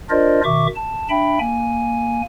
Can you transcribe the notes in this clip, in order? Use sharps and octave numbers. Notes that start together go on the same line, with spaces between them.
D4 F4 A#4 C5 D5 D#5
B2 D#3 E5 C#6 D6
A5
D4 E5 G5 B5
A#3 G#5